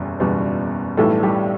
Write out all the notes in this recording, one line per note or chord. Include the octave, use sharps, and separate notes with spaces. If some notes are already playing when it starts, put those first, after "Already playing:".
Already playing: F#1 E2 B2 G3
F#1 E2 B2 G3
B1 A2 E3 G3 A3 A4
G3 G4